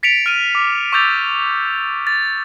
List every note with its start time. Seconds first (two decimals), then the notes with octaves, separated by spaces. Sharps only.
0.03 A6 B6 C#7 D7 F7
0.26 F6 D#7
0.55 D6
0.92 C#6 D6 E6 G6 A6 F7
2.07 A6